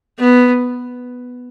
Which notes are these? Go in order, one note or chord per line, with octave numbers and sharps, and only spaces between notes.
B3